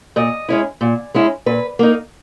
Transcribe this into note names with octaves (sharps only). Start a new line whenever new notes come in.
A#2 D#5
G#3 C#4 E4
A#2
G#3 C#4 E4
A#2 B4
A#3 D#4